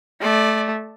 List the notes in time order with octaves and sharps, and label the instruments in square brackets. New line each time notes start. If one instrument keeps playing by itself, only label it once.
[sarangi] A3 [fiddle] D5